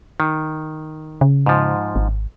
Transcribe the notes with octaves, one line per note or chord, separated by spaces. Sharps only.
D#3
C#3
G#2 F3
G#1